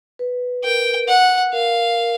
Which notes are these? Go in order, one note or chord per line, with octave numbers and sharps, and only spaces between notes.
B4
A#4 G5
F#5
A#4 F5
A#4